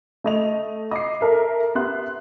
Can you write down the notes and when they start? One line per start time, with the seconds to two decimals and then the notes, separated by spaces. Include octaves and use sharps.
0.24 A3 D#5 F7
0.91 D#5 D6 C7
1.21 A4 A#4 E5
1.75 B3 G4 E5 C6 F#6